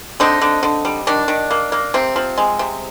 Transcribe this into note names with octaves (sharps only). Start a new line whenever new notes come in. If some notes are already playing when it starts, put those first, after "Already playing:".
D3 C4 D#4
D3
D3
G3
D#3 D4
D#3
A#3
A#3
C3 C4
F3
G#3
C3